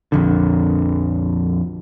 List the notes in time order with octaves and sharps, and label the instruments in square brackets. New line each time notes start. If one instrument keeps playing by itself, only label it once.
[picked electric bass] A#1 F2 D3